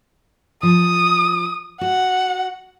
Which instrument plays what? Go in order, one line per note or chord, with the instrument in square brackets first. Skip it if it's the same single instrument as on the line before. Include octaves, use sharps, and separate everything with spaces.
[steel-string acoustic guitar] F3 [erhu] D#6
[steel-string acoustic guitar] F#4 [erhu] F#5